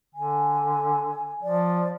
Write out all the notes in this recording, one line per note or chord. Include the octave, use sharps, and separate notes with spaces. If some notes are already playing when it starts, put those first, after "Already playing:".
D3 G#5
F3 D5